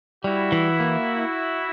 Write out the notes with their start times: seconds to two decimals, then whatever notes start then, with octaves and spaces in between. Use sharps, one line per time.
0.24 G3 E4 F#4
0.52 E3
0.80 A#3